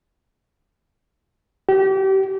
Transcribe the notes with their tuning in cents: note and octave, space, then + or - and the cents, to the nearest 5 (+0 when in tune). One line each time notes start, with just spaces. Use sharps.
G4 -30